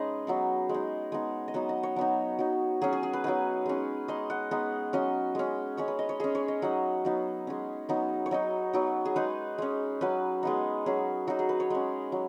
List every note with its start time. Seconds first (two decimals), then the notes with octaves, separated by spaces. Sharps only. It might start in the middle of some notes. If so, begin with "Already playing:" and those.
Already playing: G#3 C#4 D#4 G#4 B4 D#5
0.27 F#3 B3 D#4
0.69 G#3
0.74 D#4
1.12 G#3 B3 D#4
1.48 D#5
1.54 F#3 B3 D#4 F#5
1.69 D#5
1.83 C#5
1.96 F#3 B3 D#4
2.39 F#3 D#4
2.82 F#3 C#4 G#4
2.93 G#4
3.03 G#4
3.13 B4
3.24 F#3 B3 D#4 B4
3.66 G#3 C#4
4.08 G#3 D#4 D#5
4.30 F#5
4.51 G#3 B3 D#4
4.93 F#3 C#4 D#5
5.35 G#3 C#4
5.77 G#3 C#4 C#5
5.88 B4
5.99 D#5
6.09 C#5
6.20 G#3 C#4 G#4
6.35 C#5
6.48 D#5
6.62 F#3 D#4 F#5
7.05 F#3 B3 D#4
7.47 G#3 C#4
7.89 F#3 B3 D#4
8.26 C#5
8.31 F#3 D#4 D#5
8.73 F#3 B3 D#4
9.05 G#4
9.16 G#3 D#4 B4
9.58 G#3 C#4
10.01 F#3 C#4 B4
10.43 G#3 B3 D#4
10.86 F#3 C#4 G#4
11.28 F#3 D#4 F#4
11.39 G#4
11.49 B4
11.60 C#5
11.70 G#3 C#4
12.12 F#3